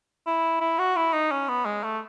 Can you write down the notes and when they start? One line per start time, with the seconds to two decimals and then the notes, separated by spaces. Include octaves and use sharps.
0.26 E4
0.61 E4
0.79 F#4
0.96 E4
1.13 D#4
1.31 C#4
1.48 B3
1.66 G#3
1.83 A3